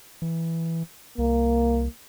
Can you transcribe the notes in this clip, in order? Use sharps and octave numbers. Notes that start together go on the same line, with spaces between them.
E3
C2 A#3